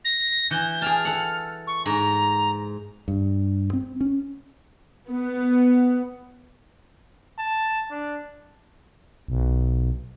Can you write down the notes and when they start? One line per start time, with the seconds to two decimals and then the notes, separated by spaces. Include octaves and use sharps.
0.04 A#6
0.51 E3 G6
0.82 G#4 G5 A5 F6
1.05 A4 F#5
1.67 C#6
1.86 G#2 A#5
3.08 G2
3.73 C4
4.01 C#4
5.08 B3
7.38 A5
7.91 D4
9.28 B1